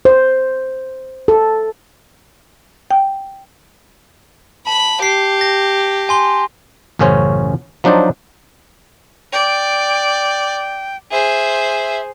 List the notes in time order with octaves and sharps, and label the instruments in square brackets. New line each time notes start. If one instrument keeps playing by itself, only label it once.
[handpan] C5
A4
[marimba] G5
[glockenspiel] A5 [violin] B5
[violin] G4 [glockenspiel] C7
[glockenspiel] A#6
G#5 C6 G7
[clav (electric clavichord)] A1 F#2 C#3 C#4 C5 C#5
F3 F#3 D4 D#4 C5 D5
[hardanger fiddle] D5 [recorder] G5
[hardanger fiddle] G#4 C5 [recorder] E5